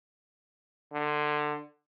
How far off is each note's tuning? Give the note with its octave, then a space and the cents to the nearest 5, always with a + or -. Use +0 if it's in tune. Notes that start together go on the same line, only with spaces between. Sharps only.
D3 +25